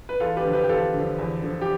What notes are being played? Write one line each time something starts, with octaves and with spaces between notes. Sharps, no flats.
B4
E2 F4 A4
G4 B4
D3 F3
G4 B4
G4
E2 F4 A4
D3 F3
E2
D3 F3
G4